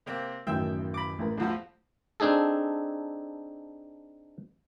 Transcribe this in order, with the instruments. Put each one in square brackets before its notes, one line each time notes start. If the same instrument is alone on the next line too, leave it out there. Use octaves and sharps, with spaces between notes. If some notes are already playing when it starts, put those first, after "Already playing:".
[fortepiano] C3 A#3 C4
[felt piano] A1 F#2 D#3 [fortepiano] E5 G5
[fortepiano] B5 D6
[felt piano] A1 A#4
[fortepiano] A1 E2 F3 [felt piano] A3 F4
[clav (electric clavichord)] C4 D4 D#4 G#4 A4